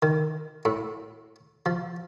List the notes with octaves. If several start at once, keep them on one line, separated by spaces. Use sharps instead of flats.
D#3
A2
F3